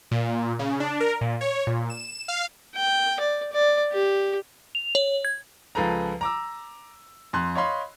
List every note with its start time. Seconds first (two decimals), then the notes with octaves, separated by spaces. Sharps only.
0.11 A#2
0.59 C#3
0.80 D4
1.00 A#4
1.21 A#2
1.41 C#5
1.67 A#2
1.90 E7
2.28 F5
2.75 G5
3.20 D5
3.53 D5
3.92 G4
4.75 F7
4.95 C#5
5.25 G#6
5.75 C#2 F3 G#4 A4 B4 A#5
6.21 A#5 D6 E6
7.33 F2 C6 F#6
7.56 C#5 D#5 F5 B5 C6